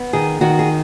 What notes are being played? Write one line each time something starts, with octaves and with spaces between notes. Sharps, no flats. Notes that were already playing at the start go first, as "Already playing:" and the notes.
Already playing: B3
D#3 G#4
D#3 F#4
G#4